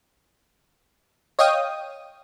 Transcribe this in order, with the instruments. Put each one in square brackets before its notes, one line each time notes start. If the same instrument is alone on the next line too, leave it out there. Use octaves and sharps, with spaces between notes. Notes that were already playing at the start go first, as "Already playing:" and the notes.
[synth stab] C#5 D#5 F5 G5 D#6